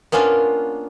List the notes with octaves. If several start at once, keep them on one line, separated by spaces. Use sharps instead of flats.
A#3 B3 C#4 D4 F4